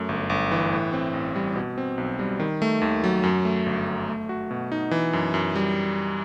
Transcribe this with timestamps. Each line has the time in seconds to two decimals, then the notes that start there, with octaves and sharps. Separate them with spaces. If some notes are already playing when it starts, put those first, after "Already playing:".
Already playing: F#2 A3
0.09 G1
0.30 G1
0.51 E3
0.72 A2
0.93 C4
1.14 A1
1.36 G3
1.56 B2
1.78 C4
1.98 B1
2.19 G3
2.40 D#3
2.62 A3
2.81 D#2
3.04 F#3
3.23 F#2
3.45 A3
3.66 G1
3.87 F#3
4.08 A3
4.29 F#4
4.51 B2
4.72 D#4
4.91 E3
5.13 F#2
5.34 F#2
5.56 G3